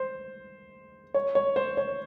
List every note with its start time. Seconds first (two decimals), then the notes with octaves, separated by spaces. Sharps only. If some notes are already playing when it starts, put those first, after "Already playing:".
Already playing: C5
1.14 C#5
1.35 C#5
1.56 C5
1.77 C#5